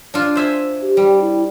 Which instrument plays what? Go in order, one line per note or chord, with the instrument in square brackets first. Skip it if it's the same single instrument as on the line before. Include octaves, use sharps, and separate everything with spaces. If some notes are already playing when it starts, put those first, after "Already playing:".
[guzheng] D4 F4
C5 E5 G#5
[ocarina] G4
[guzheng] G3
[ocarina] E4